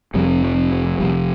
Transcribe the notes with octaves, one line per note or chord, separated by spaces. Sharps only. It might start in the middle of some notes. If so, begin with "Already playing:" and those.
F1 F2 C3 G3
F3
F3
F1 F2 C3 G3